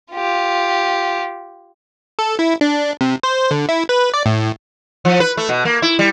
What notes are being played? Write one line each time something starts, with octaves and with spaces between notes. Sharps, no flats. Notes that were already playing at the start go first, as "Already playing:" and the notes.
F4 G4
A4
E4
D4
C3
C5
D3
E4
B4
D5
A2
F3
B4
A3
B2
A#3
E4
G3